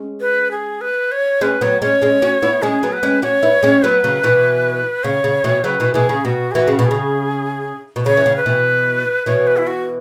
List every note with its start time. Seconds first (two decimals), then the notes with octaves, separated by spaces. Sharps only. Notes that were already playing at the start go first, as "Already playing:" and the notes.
Already playing: G#3 C#4
0.21 B4
0.51 G#4
0.81 B4
1.12 C#5
1.41 G#3 C#4 B4
1.61 F#3 B3 C#5
1.82 G#3 C#4 C#5
2.02 G#3 C#4
2.22 C#4 F#4
2.42 B3 E4
2.62 G#3 C#4 G#4
2.83 F#3 B3
2.92 B4
3.03 G#3 C#4
3.22 C#4 F#4 C#5
3.43 B3 E4
3.63 G#3 C#4
3.83 F#3 B3 B4
4.04 C#3 F#3
4.23 B2 E3
5.04 C#3 C#5
5.24 C#3
5.44 B2 E3
5.64 C#3 F#3 B4
5.80 B2 E3
5.94 B2 E3 G#4
6.09 C#3
6.25 B2 F#4
6.51 G#4
6.55 E3 F#4
6.68 C#3
6.79 B2
6.85 G#4
6.91 C#3
7.96 B2
8.05 C#3 C#5
8.17 E3
8.26 C#3
8.36 B4
8.46 B2 E3
9.26 B2 E3 C#5
9.47 B4
9.57 E4
9.67 F#4